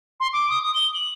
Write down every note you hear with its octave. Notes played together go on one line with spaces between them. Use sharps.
C6
D6
D#6
D#6
G7
F#7